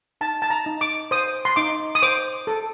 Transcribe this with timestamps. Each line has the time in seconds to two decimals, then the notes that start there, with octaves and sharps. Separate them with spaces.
0.21 D#4 A5
0.42 A5
0.50 A#5
0.66 D#4
0.81 D6
1.11 C5 D#6
1.45 C6
1.56 D#4 D6
1.95 D#6
2.02 C5 D6
2.47 A4